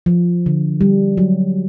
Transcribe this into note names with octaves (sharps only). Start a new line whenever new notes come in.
F3
D3
G3
F#3